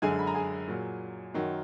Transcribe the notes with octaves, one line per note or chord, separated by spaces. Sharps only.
F#2 D3 G#3 G#4 G#5
B5
A#5
G#4 G#5
A#2 F#3
F#2 D#3 F#3